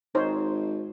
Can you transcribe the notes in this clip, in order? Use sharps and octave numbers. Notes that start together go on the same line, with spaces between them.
G#1 D#4 C5 C#5